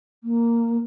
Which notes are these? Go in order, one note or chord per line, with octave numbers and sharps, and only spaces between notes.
A#3